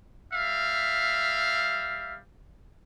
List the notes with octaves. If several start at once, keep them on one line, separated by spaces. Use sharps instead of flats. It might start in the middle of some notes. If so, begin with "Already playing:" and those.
G3 E5 F5